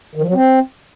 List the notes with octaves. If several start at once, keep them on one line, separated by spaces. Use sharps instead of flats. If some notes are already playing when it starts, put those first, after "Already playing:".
D#3
F3
F#3
C4